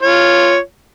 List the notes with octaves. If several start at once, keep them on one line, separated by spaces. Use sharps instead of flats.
F4 C#5